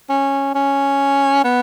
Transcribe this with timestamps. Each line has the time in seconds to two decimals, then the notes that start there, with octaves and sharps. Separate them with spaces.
0.09 C#4
0.55 C#4
1.44 B3